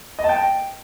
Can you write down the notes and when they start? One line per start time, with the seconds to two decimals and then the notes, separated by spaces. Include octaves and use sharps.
0.19 D#5
0.24 A5
0.29 G5